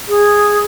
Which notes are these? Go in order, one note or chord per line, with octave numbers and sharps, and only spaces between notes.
G#4